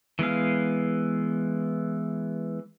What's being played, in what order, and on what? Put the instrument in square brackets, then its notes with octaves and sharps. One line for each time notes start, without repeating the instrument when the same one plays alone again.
[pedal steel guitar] E3 G#3 B3 F5